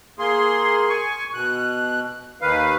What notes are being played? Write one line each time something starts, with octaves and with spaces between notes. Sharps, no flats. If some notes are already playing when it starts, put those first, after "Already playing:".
A#3 G#4 C6
G#5 C#6
B2 F#6
D#2 D#3 B4 F5